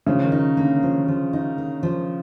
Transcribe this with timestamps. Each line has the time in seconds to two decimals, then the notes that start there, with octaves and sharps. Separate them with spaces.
0.07 C#3 F3
0.24 D#3
0.32 D#4
0.57 D3 A#3
0.83 F3
1.08 F3
1.33 D#4
1.58 A#3
1.83 F3